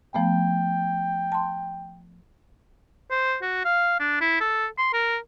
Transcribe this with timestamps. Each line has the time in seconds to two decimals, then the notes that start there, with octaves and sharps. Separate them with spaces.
0.14 F3 A3 B3 G5
1.32 A5 C6
3.11 C5
3.42 F#4
3.65 F5
4.00 D4
4.21 E4
4.41 A4
4.78 C6
4.93 A#4